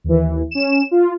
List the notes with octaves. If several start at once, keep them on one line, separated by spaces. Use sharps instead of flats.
D#2 E3
C#4 E7
F4